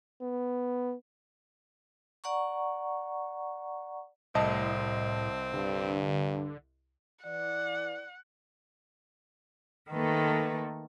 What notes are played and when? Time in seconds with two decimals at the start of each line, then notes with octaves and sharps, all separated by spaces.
0.21 B3
2.24 D5 F#5 A#5 C#6
4.35 C2 A2 C4 D#5 A5
5.53 G2 D3
7.24 E3 D5 F#5
9.90 D#3 A3 A#3 A4 B4